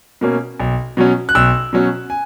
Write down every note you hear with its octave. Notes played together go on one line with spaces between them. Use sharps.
B2 A#3 C#4
B1
B2 F#3 C#4
F#6
B1 E6
B2 F#3 C#4
G#5